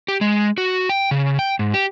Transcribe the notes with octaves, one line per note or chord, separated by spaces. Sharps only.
G4
G#3
F#4
G5
C#3
G5
G#2
G4